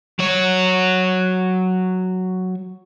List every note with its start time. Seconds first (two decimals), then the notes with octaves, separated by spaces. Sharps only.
0.19 F#3 C#5